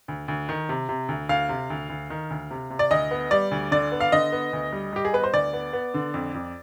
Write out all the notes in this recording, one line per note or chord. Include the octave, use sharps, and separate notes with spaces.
D2
D2
D#3
C3
C3
D2
D2 F5
C3
D2
D2
D#3
D2
C3
C3
D5
D2 D#5
B3
G3 D5
D2
D3 D5
B3
F5
D3 D#5
B3
D2
G3
G3 G4
G#4
B3 B4
C5
D2 D5
B3
B3
D3
F2
F2